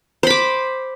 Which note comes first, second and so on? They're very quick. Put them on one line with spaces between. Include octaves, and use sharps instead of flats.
C5 B5 D6